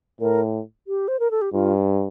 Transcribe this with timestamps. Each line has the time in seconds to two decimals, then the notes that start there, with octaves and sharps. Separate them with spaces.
0.21 A2 A#4
0.87 G4
1.08 C5
1.20 A#4
1.31 A4
1.42 G4
1.53 G2 F4